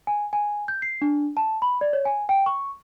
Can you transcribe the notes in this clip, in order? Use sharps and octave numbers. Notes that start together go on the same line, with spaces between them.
G#5
G#5
G6
C7
D4
A5
B5
D5
C#5
G#5
G5
C#6